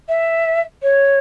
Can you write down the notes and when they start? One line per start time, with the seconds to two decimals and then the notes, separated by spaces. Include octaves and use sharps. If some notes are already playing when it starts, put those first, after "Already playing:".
0.09 E5
0.83 C#5